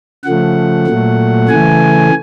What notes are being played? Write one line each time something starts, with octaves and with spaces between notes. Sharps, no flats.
C#3 F3 A3 F#5
A#2 F#3 A3
C#3 E3 A3 G#5